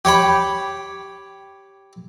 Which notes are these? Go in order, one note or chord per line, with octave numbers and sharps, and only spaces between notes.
G4 C#5 G5 B5